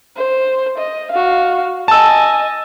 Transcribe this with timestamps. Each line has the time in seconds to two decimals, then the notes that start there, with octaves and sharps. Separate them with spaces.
0.16 C5
0.78 D#5
1.11 F#4 F5
1.88 D#5 G#5 A5 E6